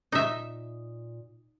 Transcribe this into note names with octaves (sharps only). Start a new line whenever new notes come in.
A#2 D#4 E5